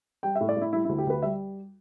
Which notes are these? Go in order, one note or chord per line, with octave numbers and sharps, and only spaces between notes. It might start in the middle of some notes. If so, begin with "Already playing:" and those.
G3 G5
A2 E5
D5
A2 E4
G3 E4
D2 E4
G4
D2 B4
G3 E5